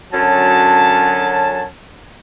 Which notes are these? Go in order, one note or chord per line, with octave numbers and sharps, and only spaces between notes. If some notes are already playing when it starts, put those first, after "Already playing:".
F#2 D3 F#3 C#4 A5